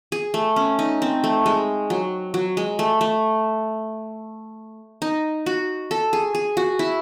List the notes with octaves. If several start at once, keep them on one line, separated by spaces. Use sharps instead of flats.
G#4
A3
C#4
D#4
C4
A3
G#3
F#3
F#3
G#3
A3
A3
D#4
F#4
A4
G#4
G#4
F#4
E4